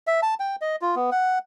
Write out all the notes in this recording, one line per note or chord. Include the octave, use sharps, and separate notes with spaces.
E5
A5
G5
D#5
F4
B3
F#5